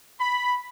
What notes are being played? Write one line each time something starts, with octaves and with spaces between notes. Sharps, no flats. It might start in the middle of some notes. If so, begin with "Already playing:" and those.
B5